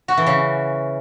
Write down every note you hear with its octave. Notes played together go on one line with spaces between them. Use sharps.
F#4
E3
C#3